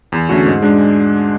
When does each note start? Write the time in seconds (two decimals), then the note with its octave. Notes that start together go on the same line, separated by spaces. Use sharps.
0.12 E2
0.29 D3 A3 C#4 F#4
0.46 G#2
0.62 G#3 D4